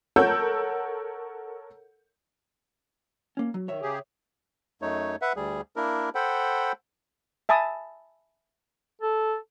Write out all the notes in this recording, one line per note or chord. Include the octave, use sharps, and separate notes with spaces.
A4 A#4 C#5 F#5 E6 G6
A#3 C#4
F#3
D#3 C#5 E5
C#3 G4 G#4
F#2 A3 D#4 C#5
B4 E5 F#5
D2 G3 G#4
A#3 D4 E4 A#4
A4 C5 F#5 G5 B5
E5 G#5 A5 B5 D#6
A4